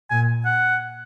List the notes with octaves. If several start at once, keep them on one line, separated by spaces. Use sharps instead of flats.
A#2 G#5
F#5